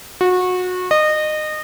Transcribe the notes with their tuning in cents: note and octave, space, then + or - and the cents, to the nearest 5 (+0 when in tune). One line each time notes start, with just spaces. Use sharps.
F#4 -25
D#5 -25